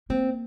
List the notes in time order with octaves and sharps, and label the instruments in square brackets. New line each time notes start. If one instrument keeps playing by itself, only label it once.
[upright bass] A#3 [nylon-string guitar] C4